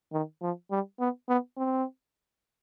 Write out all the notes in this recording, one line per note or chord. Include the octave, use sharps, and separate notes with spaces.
D#3
F3
G3
B3
B3
C4